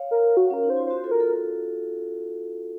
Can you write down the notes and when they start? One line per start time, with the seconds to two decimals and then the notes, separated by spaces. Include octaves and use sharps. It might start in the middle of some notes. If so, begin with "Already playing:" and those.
Already playing: C#5 F5
0.11 A#4
0.37 F#4
0.50 C#4 A#4
0.64 D#4
0.70 C5
0.77 F4
0.86 F#4 C5
1.04 F4 A4
1.11 A#4
1.20 F4 A4